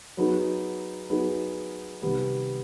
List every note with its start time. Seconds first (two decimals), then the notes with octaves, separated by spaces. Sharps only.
0.17 F#3 B3 D#4 G#4
1.09 F#3 B3 D#4 G#4
2.02 C3 D#3 G3 B3